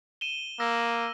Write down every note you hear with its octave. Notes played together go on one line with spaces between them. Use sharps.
D#7 E7 G7
A#3 E6 A#6